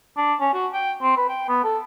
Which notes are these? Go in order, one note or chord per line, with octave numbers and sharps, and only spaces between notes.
D4
C#4
F#4
G5
C4
B4
G5
B3
A4